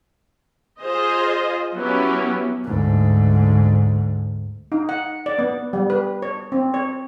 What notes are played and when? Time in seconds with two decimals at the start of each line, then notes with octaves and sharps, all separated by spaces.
0.80 F4 G#4 C5 D#5
1.75 F#3 B3 C#4 E4 G4
2.64 D2 G#2
4.72 D#4
4.89 F#5
5.26 D5
5.39 B3
5.73 G3
5.90 B4
6.22 C#5
6.52 C4
6.74 C#5